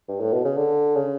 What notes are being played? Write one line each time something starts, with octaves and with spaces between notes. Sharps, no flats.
G2
A2
B2
C#3
D3
C#3